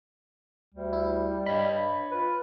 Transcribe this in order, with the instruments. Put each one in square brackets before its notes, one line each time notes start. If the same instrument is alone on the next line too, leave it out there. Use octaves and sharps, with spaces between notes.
[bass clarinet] D2 [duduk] G3
[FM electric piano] E4
[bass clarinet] G2 [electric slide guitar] C#5 D#5 [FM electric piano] B5
[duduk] F4 [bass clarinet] B4